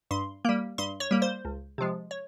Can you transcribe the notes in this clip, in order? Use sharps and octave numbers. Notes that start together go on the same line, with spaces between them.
G2 C6
G3 A#3
G2 C6
C#5
G3 A#3
C5
C#2
C3 F3 G#3
C#5